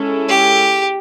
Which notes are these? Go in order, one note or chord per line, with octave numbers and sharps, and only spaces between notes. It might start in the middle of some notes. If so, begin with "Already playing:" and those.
Already playing: G#3 C#4 E4 A4
G4